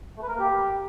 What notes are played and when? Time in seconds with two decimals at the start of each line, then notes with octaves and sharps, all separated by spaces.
0.17 A3
0.23 B4
0.28 A#4
0.34 A#3
0.40 G4